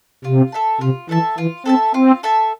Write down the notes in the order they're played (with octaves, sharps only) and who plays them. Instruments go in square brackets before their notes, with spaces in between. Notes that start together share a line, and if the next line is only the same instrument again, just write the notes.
[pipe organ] C3 [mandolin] F4
[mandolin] A4 E5 A5
[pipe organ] C3 [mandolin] F4
[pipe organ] E3 [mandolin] A4 E5 A5
[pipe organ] E3 [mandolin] F4
[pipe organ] C4 [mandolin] A4 E5 A5
[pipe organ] C4 [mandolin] F4
[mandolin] A4 E5 A5